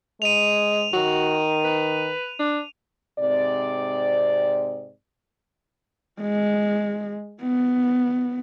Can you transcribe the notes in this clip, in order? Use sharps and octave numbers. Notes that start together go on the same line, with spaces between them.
G#3 D#7 F7
D#3 F#4
B4
D4
G#2 C3 C4 D5
G#3
B3